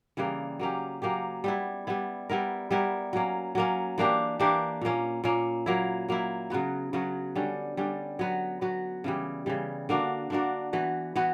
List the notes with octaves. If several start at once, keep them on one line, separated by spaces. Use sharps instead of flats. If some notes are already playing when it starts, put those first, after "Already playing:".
C#3 E3 G3 A#3
F#3 A#3 C#4 G4
F#3 A#3 C#4 G4
G3 B3 E4
G3 B3 E4
G3 B3 E4 A#4
G3 B3 E4 A#4
F#3 A#3 C#4
F#3 A#3 C#4
E3 A#3 D4 G4
E3 A#3 D4 G4
A#2 A#3 C#4
A#2 A#3 C#4
F#3 A#3 E4
F#3 A#3 E4
C#3 F#3 B3 F#4
C#3 F#3 B3 F#4
D3 G3 C#4
D3 G3 C#4
F#3 B3 F#4
F#3 B3 F#4
C#3 E3 G3
C#3 E3 G3
D3 A#3 D4 F#4
D3 A#3 D4 F#4
E3 B3 F#4
E3 B3 F#4